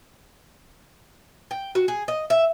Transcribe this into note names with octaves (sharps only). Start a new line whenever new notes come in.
G5
F#4
G#4
D#5
E5